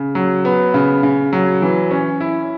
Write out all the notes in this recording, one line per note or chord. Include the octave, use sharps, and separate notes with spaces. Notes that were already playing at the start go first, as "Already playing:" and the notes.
Already playing: C#3
F#3
B3
C#3
C#3
F#3
E3
C#4
E4